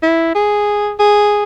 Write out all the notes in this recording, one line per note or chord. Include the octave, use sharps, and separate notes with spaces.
E4
G#4
G#4